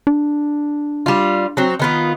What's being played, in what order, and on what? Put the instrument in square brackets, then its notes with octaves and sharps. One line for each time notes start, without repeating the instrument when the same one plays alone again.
[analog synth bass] D4
[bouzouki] G3 F4
F#3 C4
D#3 B3 F4